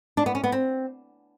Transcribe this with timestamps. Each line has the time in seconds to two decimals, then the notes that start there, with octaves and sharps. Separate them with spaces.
0.17 D4
0.26 B3
0.35 C#4
0.44 B3
0.52 C4